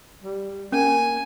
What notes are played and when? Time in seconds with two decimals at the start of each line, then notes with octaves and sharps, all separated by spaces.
0.24 G3
0.72 A#3 C#4 G#5